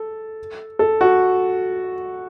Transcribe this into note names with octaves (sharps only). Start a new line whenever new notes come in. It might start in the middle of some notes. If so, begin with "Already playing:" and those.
Already playing: A4
A4
F#4